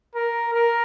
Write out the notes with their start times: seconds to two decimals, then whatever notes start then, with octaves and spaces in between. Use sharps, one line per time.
0.15 A#4
0.54 A#4